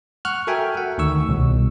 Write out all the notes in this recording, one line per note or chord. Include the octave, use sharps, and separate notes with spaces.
F#5 C#6 F6 F#6
F#4 A4 A#4 E5 G5 G#5
F#5
D2 D#3 C#6 E6
C2 B2